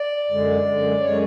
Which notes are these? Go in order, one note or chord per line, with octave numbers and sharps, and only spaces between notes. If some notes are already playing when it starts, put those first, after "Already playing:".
Already playing: D5
F#2 D3 G#3
F#2 D3 G#3
F#2 D3 G#3 C#5